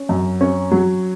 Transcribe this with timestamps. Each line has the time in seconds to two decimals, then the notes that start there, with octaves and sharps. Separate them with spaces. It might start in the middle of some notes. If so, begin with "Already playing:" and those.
Already playing: C#4
0.09 F#2
0.41 C#4
0.71 F#3